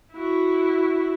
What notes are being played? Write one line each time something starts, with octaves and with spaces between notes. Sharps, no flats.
E4 F#4